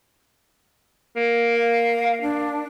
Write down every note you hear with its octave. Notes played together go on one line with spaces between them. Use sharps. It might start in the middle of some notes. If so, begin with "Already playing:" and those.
A#3
F5
D4